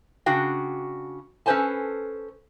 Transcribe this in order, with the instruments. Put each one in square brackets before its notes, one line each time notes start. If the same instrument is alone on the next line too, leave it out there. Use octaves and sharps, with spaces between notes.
[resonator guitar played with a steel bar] C#3 D4 F#4 G5
C#4 A4 B4 C5 G#5 A5